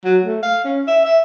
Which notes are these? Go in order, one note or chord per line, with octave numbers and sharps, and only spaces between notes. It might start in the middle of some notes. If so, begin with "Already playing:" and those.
F#3
A3
F5
C#4
E5
E5